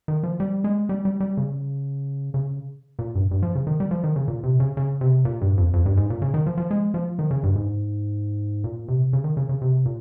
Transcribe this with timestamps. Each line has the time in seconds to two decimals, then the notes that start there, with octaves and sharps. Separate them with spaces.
0.08 D#3
0.23 F3
0.40 G3
0.64 G#3
0.89 G3
1.05 G3
1.20 G3
1.37 C#3
2.34 C#3
2.99 A#2
3.15 G2
3.31 G2
3.43 F3
3.55 C#3
3.67 D#3
3.80 G3
3.91 F3
4.04 D#3
4.16 C#3
4.28 A#2
4.43 C3
4.60 C#3
4.77 C#3
5.01 C3
5.25 A#2
5.41 G2
5.58 F2
5.73 F2
5.86 G2
5.97 G#2
6.10 A#2
6.22 C#3
6.34 D#3
6.46 F3
6.58 F3
6.71 G#3
6.94 F3
7.19 D#3
7.31 C#3
7.43 G2
7.56 G#2
8.64 A#2
8.88 C3
9.13 C#3
9.24 D#3
9.37 C#3
9.49 C#3
9.62 C3
9.86 A#2